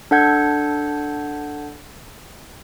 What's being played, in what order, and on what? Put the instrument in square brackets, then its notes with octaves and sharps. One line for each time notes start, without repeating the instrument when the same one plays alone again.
[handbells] D4 A4 F#5 G6 G#6